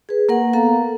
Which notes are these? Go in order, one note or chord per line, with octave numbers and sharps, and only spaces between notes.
G#4 B4
A#3 A#4 F#5
B3 A4 F5 A#5